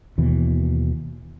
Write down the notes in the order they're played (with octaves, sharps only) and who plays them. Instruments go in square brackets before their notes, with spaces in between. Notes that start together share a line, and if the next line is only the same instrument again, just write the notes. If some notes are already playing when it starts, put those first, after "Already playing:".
[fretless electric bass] D#2 B2 E3